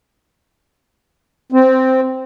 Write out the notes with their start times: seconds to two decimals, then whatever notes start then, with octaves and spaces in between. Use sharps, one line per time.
1.52 C4